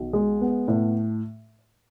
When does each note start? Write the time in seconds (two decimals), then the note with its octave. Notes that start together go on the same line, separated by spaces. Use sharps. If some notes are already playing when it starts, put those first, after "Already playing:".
Already playing: B1
0.13 G#3
0.41 B3
0.68 A2